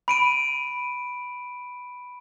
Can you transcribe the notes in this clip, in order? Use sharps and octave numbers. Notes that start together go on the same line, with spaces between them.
B5 D7 D#7